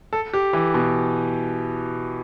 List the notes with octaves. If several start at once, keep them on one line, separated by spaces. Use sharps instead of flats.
A4
G4
E3
B2